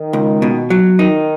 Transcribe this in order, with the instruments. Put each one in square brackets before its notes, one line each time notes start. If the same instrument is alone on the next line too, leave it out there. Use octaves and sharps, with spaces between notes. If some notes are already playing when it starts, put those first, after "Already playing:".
Already playing: [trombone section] D#3
[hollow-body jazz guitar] C#2
B2
F#3
[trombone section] D#3 [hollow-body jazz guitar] D#4